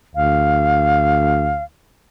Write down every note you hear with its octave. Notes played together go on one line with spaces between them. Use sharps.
D2 F5